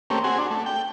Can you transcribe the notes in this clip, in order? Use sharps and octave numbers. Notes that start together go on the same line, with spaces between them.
A3 A#3 C4 C#4 G4
C4 F#4 G#4
D4
A3
G5